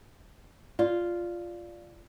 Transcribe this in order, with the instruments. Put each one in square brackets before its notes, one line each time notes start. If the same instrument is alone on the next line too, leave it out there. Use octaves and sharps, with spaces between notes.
[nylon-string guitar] F4 [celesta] D5